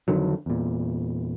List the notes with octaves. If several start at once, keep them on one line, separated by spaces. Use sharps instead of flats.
F2 D3 D#3 F#3
E2 A#2